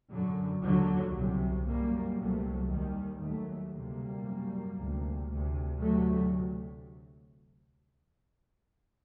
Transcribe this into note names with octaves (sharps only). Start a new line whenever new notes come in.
F#2 D3 F#3
D#2 D3 F#3
C2 C3
F#2 G3 A#3
C2 C3 F#3 A3
D#2 D#3 G3
D#2 F#3 A3
D2 C3 G3 A#3
F#2
D2 C3
D2 C3
D2 C3 F#3 A3